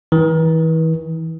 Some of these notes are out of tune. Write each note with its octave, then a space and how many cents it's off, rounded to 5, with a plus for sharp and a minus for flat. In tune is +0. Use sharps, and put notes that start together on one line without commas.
E3 -35